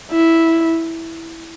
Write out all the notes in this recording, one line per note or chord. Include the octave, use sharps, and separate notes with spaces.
E4